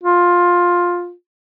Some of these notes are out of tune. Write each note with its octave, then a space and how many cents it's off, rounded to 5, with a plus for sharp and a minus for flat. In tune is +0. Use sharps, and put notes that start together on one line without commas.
F4 +10